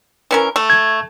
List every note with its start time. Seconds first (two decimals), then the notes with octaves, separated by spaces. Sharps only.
0.31 E3 C#4 A#4
0.56 A3
0.70 G#6